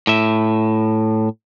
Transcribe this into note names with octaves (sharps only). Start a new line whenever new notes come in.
A2 E5